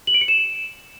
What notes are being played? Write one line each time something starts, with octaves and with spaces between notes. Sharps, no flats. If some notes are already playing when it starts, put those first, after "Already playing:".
F#7
D7
C#7
E7